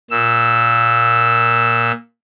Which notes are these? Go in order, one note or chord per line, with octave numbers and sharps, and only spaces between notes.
A#2 E6